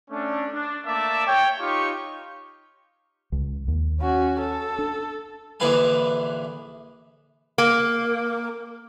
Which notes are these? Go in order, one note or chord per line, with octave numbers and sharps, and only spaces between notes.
A3 C#4 D4
D4
A3 A#3 D5 E5 A5 D6
C#5 G5
D#4 F4 G4 C#5 G5 C#6
C#2
D#2
C#4 F#4
A4
D4
A#1 D3 E3 B4 F5 G#5
A#3